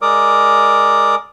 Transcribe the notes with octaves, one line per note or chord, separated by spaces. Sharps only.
G#3 A#4 D5 D6 D#6